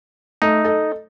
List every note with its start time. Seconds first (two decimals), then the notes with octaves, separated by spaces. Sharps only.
0.42 A3 D#4
0.64 A4 D#5